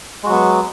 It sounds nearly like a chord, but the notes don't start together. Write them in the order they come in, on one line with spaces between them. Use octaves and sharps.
G#3 F#4 F#3 B3